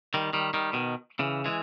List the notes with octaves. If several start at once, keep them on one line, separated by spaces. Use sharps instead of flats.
D#3 G3
D#3 G3
D#3 G3
B2 D#3
C#3 E3
E3 G#3